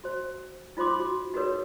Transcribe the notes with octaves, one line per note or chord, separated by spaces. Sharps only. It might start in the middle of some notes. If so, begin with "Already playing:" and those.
F#4 C5
D#4 F4 C5 C6 D6
F#4
D#4 F#4 G#4 A#4 B4 C#5